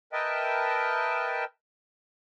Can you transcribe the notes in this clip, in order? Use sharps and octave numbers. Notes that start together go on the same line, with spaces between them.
A#4 B4 D#5 E5 G5 A5